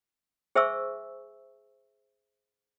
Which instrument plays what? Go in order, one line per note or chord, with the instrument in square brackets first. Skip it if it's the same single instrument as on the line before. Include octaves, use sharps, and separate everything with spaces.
[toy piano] G#4 C5 E5 G#5 C#6 E6